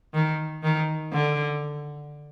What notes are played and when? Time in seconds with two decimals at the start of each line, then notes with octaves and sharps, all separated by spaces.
0.14 D#3
0.63 D#3
1.12 D3